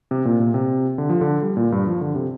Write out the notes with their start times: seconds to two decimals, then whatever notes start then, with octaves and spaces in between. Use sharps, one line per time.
0.11 C3
0.25 A#2
0.40 A#2
0.54 C3
0.98 D3
1.09 F3
1.21 D3
1.42 G3
1.57 A#2
1.72 G2
1.87 F3
2.01 D3
2.15 C3